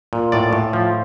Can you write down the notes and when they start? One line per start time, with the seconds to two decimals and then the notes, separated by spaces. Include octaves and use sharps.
0.13 A#2
0.32 A2 D5
0.53 A2
0.73 F3